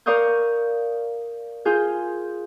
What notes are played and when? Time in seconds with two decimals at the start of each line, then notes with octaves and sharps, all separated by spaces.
0.06 A#4 D5 F5 C#6 D#6 G6
1.65 F4 G#4 G6